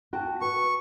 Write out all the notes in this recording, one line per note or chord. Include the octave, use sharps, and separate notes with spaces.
F#4 G5 A5
B4 C#6